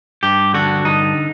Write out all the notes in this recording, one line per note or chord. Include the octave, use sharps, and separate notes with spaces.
G2 G4
D3 F#4
G2 D#4